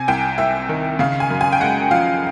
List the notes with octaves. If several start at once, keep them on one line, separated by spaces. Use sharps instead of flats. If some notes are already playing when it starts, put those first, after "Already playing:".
Already playing: C3 G#5
C2 G5
C2 E5
D#3
C#3 F5
G#5
F#2
G#5
G5
G#3 F#5
F3 F5